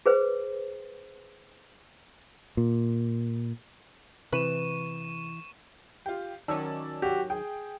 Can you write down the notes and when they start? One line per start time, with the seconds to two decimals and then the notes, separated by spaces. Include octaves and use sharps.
0.06 G#4 B4 C5
2.57 A#2
4.33 C3 E3 B4 C#6 D#7 E7
6.06 F4 G4
6.48 D#3 F#3 C#4 D5 A5 E6
7.02 F#4 G4
7.30 G#4 G5